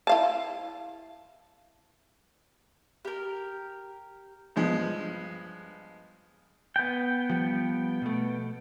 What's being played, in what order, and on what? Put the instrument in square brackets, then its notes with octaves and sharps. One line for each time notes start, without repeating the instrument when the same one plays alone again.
[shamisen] E4 F5 A5
[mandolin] G4 A#4
[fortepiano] G2 F3 G#3 B3
[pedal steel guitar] B3 G5
[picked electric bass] F3 G3
B2 A3